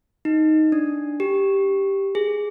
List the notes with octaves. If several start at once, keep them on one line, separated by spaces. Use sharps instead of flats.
D#4
D4
G4
G#4